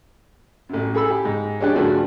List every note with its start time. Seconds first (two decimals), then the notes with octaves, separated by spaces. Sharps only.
0.69 A1 F#2
0.94 G#4 A4 B5 E6
1.10 G4
1.25 G#2
1.61 G#3 C#4 D4 G4 D5 F#6
1.75 G2 C#3 F3 A3 D4 F#4